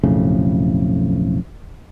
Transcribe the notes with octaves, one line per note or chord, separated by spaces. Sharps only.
B1 F2 A2 C#3